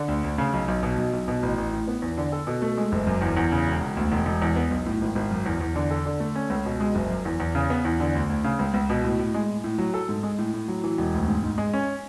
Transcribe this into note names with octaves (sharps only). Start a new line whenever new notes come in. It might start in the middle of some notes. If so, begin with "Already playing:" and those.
Already playing: D3
D2
D2
C#3
B1
B1
B2
B1
B1
B2
A1
A1
A2
B3
E2
D3
A4
B2
A3
G#3
F#1
F#2
E2
E2
C#3
E1
E1
D2
E1
E1
E2
B3
B1
A2
G#1
G#1
F#2
E2
E2
D3
A4
D3
A3
C#4
C#2
B2
G#3
F#1
F#2
E2
E2
C#3
B3
E2
D3
D2
D2
C#3
C#2
C#2
B2
A2
A2
G#3
A2
A2
F#3
A4
G#2
G#3
A2
A2
F#3
E3
E1
D2
G#2
G#2
G#3
C#4